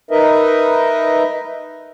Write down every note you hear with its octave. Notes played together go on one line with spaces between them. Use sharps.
D#4 A#4 B4 D#5 E5